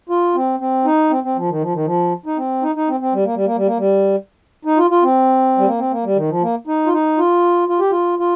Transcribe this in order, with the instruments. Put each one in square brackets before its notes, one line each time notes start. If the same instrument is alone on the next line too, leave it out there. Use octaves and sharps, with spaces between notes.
[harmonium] F4
C4
C4
D#4
C4
C4
F3
D#3
F3
D#3
F3
D#4
C4
D#4
D#4
C4
C4
G3
A#3
G3
A#3
G3
A#3
G3
D#4
F4
F4
C4
G3
A#3
C4
A#3
G3
D#3
F3
A#3
D#4
F4
D#4
F4
F4
G4
F4
F4